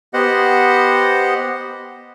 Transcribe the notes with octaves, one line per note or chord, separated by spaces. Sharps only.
B3 G4 C5 D#5 F#5